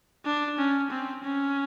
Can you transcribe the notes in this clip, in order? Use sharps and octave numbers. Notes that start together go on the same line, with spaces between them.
D4
C#4
C4
C#4